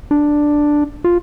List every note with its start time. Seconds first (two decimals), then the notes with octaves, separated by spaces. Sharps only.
0.11 D4
1.04 F4